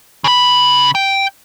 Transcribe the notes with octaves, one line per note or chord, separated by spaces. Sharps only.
C#3 B5
G5